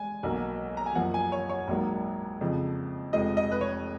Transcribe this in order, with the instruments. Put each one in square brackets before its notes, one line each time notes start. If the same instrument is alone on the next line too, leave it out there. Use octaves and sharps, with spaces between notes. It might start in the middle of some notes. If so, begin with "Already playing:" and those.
Already playing: [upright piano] G#3 G#5
B1 B2 F#3 A#3
A#5
G#5
F#2 F3 A#3 F#5
G#5
C#5
C#5
A#1 G#2 F#3 A#3
F2 C#3 F3
F1 F2 F3 G#3 D#5
D#5
B4
C#5